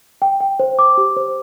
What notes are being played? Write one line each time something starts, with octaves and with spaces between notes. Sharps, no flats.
G5
G5
C5
D6
G4
C5